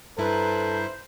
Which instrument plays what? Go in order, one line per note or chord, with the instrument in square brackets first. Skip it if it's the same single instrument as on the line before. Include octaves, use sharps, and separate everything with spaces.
[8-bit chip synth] G2 E4 [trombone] A4 [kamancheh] B4 A#5 [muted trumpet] C5